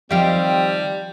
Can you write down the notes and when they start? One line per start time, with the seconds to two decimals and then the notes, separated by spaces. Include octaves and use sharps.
0.11 D#3 F3 G3 C4 G4 E5 F5